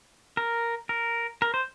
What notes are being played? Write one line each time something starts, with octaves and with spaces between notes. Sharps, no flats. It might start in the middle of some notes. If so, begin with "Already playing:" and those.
A#4
A#4
A#4
C5